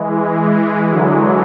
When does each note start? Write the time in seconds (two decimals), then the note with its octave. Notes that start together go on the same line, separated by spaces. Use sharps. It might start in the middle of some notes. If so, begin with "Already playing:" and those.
Already playing: E3 G#3
0.92 D3 F#3